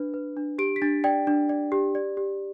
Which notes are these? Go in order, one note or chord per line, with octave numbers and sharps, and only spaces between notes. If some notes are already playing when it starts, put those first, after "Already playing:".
Already playing: D4 B4
B4
D4
G4 D7
B6
D4 A6
D5 G5
D4
D5
G4
D5
G4